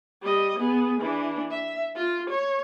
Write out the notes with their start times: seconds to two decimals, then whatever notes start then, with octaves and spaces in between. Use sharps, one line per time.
0.22 G3 D#5
0.59 B3 G#4
1.01 E3 D4
1.51 E5
1.95 F4
2.30 C#5